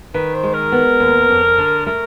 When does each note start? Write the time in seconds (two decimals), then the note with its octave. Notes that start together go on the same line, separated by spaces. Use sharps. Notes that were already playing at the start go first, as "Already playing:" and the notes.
0.14 D#3 B4
0.34 C5
0.43 G#3
0.54 A#4
0.72 B3
1.00 D#2
1.29 F2
1.58 D3
1.86 A3 A#4